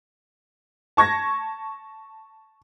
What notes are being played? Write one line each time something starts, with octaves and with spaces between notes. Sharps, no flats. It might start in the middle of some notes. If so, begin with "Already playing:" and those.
A5 C#6 G#6 A#6